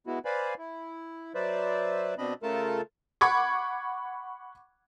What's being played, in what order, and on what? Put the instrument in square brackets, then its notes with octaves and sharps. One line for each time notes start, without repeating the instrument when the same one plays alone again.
[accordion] G#3 B3 E4 F#4
B4 C5 D5 F5 G#5 B5
E4
F#3 B4 C5 D5 E5
B2 C4 D4 D#5 B5
C#3 A3 F4 A4 A#4 A5
[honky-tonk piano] F#5 B5 C#6 D6 G#6